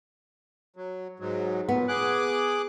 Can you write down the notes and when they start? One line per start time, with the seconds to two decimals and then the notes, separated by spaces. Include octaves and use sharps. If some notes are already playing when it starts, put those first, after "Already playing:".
0.76 F#3
1.20 G#2 F#3
1.69 A#2 B3
1.88 G#4 D6 F#6